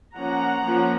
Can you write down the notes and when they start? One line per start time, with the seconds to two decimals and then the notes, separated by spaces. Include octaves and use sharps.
0.16 F3 A#3 C#4 F#5 A#5
0.64 F3 A#3 C#4